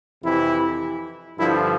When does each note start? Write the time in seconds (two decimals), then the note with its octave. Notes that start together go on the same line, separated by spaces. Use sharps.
0.23 F2 C3 E3 E4
1.38 G2 D3 F3 E4